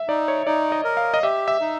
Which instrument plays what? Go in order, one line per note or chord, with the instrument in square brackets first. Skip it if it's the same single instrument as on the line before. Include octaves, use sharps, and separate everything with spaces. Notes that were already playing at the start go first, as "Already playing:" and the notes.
Already playing: [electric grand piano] E5
[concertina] D#4 [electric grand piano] D5
[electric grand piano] C#5
[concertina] D#4 [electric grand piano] D5
[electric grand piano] D#5
[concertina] A#4
[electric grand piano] F5
D#5
[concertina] G4 [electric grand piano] E5
[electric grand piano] E5
[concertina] D#4